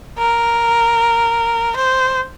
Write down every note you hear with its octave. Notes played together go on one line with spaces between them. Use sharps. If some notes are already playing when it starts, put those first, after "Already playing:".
A#4
C5